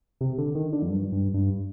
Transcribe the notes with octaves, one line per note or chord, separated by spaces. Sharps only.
C3
D3
D#3
D3
F2
G2
G2
G2